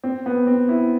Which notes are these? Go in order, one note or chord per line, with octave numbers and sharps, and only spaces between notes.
C4
B3
C4
E4